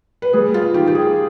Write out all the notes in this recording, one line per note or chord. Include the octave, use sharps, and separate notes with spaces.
B4
G3 G#4
F4
D#3 G4
G4
G#4